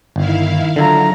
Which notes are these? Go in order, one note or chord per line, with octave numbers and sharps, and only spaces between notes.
G1 D#3 E4 F5
D3 F#3 D4 E4 F4 A#5